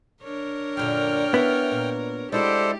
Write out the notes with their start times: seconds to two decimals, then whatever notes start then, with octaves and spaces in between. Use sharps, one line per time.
0.22 D4 A#4 C#5
0.77 F#2 A#2 D3 G5 F6
1.34 B3 C#4 E4
1.72 A#2
2.32 G#3 E4 F#4 G4 A4 C5 D5